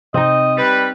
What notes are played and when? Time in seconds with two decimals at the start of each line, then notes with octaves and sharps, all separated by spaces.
0.14 C3 C4 D#4 D#5
0.57 G3 B4